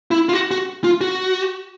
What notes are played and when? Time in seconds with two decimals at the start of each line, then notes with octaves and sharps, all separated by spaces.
0.11 E4
0.29 F4
0.33 F#4
0.51 F#4
0.84 F4
1.01 F#4